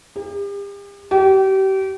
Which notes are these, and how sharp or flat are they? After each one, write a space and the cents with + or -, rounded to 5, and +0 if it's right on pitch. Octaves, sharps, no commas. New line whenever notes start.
G4 +40
G4 -35